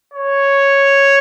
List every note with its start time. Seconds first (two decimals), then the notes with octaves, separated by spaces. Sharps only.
0.14 C#5